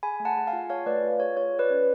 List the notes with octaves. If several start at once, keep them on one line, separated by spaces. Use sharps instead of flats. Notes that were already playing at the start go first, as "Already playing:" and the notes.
G#4 G#5 B5
A3
F#5 A5
G#4
F5 G#5
F4
G#4 C#5 F5
A3 B4 D5
F4
G#4 C#5
F4 C#5
G#4
B4 D5
C#4